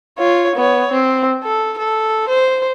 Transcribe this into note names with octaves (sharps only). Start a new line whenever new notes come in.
F4 C#5
B3 C#5
C4
A4
A4
C5